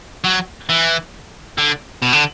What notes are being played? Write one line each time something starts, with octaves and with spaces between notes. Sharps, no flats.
F#3
E3
D3
B2
D3